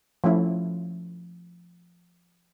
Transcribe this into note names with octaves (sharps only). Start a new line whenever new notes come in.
F3 A3 C#4 E4